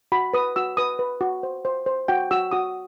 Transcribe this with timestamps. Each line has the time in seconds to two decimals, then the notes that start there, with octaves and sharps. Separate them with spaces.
0.12 F#4 B5
0.33 B4 D#6
0.56 F#4 E6
0.77 B4 D#6
0.99 B4
1.21 F#4
1.43 C5
1.65 C5
1.86 C5
2.08 F#4 G5
2.31 F#4 E6
2.52 F#4 D#6